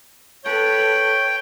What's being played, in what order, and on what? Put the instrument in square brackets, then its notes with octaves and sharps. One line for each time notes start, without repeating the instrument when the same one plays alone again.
[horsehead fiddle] A4 B4 [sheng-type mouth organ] C#5 [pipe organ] G5